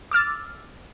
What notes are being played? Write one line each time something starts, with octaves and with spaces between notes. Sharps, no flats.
D6 E6 F6 A6